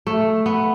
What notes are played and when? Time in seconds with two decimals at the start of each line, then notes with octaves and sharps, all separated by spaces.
0.07 A3
0.46 B3